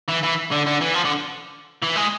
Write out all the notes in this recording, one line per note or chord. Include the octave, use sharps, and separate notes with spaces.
E3
E3
D3
D3
E3
F3
D3
E3
G#3